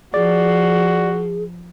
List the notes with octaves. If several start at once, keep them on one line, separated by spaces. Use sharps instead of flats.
F3 F#4 G#4 D5